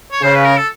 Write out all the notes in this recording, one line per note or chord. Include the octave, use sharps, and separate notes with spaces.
C#5
C#3 C5
B4
A#4
A4